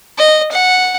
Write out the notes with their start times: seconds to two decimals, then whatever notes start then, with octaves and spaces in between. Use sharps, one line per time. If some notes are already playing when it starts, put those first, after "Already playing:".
0.18 D#5
0.52 F#5